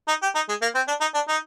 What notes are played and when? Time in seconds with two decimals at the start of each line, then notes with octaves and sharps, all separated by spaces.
0.08 D#4
0.22 G4
0.35 D#4
0.49 G#3
0.62 A#3
0.75 C4
0.88 D4
1.01 D#4
1.14 D4
1.28 D#4